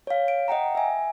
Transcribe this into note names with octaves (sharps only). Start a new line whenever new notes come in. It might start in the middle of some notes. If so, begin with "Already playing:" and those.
C#5 F5
D7
D#5 F#5 G5 A#5
E5 G#5